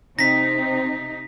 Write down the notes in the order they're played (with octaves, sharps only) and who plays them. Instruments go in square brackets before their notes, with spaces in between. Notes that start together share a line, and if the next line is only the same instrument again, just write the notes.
[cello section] C3 D#4 [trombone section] C4 [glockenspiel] A#6 B6